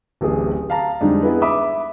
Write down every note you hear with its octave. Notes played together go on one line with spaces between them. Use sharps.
D1 A1 G4 G#4
F5 A5 A#5
F2 D3 G3 G#3 D4 D#4
B3 E4 G#4 B4
E5 B5 D6 D#6